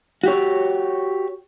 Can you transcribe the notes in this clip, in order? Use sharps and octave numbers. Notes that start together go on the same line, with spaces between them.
F#4 G4 C#5